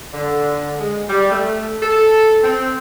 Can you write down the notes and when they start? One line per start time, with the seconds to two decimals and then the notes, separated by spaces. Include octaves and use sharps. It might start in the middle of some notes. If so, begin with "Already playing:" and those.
0.14 D3
0.79 G#3
1.09 G3
1.31 A3
1.83 A4
2.43 C4